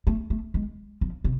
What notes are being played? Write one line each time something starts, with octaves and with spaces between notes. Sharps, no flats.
A3
A3
G#3
F3
C3